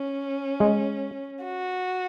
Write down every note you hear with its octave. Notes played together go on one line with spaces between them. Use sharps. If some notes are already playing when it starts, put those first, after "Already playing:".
Already playing: C#4
G#3
F#4